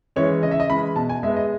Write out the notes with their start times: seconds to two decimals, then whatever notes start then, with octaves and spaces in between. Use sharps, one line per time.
0.16 E3 G#3 C#4 C#5
0.43 C#3 D#5
0.51 E5
0.60 D#5
0.70 E3 G#3 C#4 B5
0.96 B2 A5
1.09 G#5
1.23 G#3 E5
1.27 B3
1.36 D#5